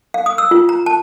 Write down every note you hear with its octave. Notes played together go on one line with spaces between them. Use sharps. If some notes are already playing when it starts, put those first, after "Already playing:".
F5
D#6
E6
F4
A#5
A5